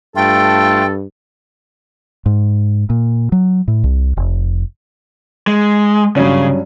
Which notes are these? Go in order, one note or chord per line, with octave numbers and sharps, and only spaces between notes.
G2 A3 F4 A4 G5
G#2
A#2
F#3
A2
C2
F1
G#3
G2 C#3 F#3 C#4